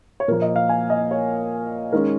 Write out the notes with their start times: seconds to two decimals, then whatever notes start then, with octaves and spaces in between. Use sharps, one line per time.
0.20 C#5
0.28 A#2 F3 A#3 A#4
0.42 D#5
0.56 F5
0.69 G#5
0.90 D#5
1.11 C#5
1.92 D#3 G#3 C#4 A#4